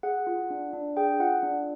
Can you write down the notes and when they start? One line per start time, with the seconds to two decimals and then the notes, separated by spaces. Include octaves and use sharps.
0.03 G#4 F#5
0.27 F4
0.50 D4
0.73 D4
0.97 G#4 G5
1.20 F4 F#5
1.43 D4